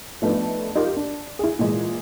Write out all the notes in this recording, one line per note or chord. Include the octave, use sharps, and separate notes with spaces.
F3 A3 B3 D4 D#4
D#4 F4 G4 A#4
D4
E4 G#4
A#2 E3 G#3